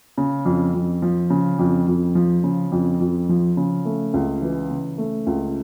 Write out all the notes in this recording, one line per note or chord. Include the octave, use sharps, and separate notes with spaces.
C#3
F2
F2
F3
C#3
F2
F2
F3
C#3
F2
F2
F3
C#3
A3
C#2
E3
C#3
A3
C#2